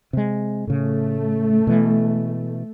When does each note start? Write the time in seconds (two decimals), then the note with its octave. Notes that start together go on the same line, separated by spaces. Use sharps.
0.13 C3 G#3
0.67 A2 C#3 A3
1.67 B2 E3